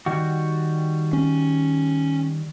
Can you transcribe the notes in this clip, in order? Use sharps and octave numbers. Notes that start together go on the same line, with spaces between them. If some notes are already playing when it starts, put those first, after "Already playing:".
D#3 G3 F#4
C#4